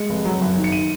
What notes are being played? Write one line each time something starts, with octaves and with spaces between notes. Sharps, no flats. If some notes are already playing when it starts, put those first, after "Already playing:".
Already playing: G#3 C#7
F1
F#3
F#1
D#3
C#7
D#7